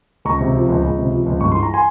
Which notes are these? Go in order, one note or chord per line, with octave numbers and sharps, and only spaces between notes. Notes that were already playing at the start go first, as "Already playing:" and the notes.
C#2 A#5 C#6
C3
F3
C#2
C#2
C3
F3
C#2
G2 C#6
E3 C6
A#5
G#5 C6